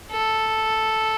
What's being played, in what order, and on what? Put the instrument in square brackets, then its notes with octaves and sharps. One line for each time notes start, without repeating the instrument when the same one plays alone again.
[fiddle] A4